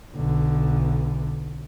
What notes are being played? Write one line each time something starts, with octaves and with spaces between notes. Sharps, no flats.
B1 D3